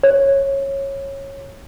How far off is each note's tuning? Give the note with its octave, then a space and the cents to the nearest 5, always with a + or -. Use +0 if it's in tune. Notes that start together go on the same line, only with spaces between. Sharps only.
C#5 -15